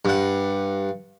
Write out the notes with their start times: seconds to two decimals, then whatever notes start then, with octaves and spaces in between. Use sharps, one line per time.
0.05 G2 F#5